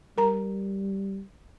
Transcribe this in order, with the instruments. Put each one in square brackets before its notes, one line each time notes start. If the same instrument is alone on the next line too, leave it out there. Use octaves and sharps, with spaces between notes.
[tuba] G3 [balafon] A#4 A#5